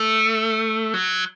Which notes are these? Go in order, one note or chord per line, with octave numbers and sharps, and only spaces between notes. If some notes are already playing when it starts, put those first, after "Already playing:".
Already playing: A3
F#3